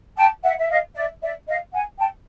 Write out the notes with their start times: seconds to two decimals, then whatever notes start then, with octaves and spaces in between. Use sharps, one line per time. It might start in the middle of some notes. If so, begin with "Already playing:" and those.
0.17 G5 A5
0.44 E5 F#5
0.58 E5
0.69 D#5 F5
0.95 D5 E5
1.22 D5 E5
1.47 D#5 F5
1.73 F#5 G#5
1.99 G5 A5